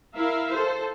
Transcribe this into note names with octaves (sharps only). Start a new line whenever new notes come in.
E4 A#4 E5 F5
A4 C5